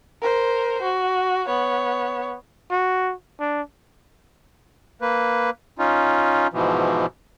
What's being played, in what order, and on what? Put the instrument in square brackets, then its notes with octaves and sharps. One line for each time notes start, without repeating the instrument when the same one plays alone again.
[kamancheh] A#4 C5
F#4
B3 C#5
[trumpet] F#4
D4
[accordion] A#3 B4
C#4 D#4 F4
G#2 B2 E3 F3